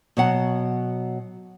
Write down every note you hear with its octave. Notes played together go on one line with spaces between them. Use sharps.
B2 F#3 F#5